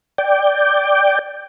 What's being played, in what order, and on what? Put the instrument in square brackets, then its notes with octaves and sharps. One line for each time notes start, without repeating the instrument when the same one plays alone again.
[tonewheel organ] D5 G5